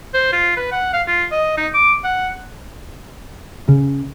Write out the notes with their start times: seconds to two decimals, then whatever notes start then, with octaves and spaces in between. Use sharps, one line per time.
0.14 C5
0.32 F4
0.57 B4
0.72 F#5
0.93 F5
1.07 F4
1.32 D#5
1.57 D#4
1.74 D6
2.04 F#5
3.68 C#3